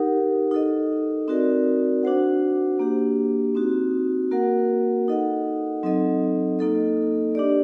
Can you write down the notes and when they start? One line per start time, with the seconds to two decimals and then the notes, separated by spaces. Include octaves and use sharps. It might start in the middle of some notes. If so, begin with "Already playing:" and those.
Already playing: D#4 G4 A#4 F#5
0.51 D#4 A4 D#5
1.28 C4 D#4 F#4 A#4 D5
2.03 D4 F#4 C5 F#5
2.79 A#3 D4 G4
3.55 C4 D#4 F#4
4.31 A#3 F#4 A#4 F#5
5.08 D#4 A4 D#5 F#5
5.83 F#3 C4 D#4 A4 D#5
6.59 A#3 D#4 A4 D#5
7.35 D4 G4 D5